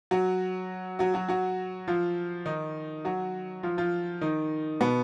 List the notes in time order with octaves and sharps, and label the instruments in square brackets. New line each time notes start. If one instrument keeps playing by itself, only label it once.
[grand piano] F#3 F#4
F#3 F#4
F#3 F#4
F#3 F#4
F3 F4
D#3 D#4
F#3 F#4
F3 F4
F3 F4
D#3 D#4
B2 B3